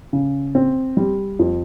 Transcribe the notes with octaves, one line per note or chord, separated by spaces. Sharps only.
C#3
C4
G3
F2